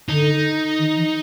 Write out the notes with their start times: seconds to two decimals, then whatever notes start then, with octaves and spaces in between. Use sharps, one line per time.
0.08 D3 D#4
0.78 D#3
0.96 E3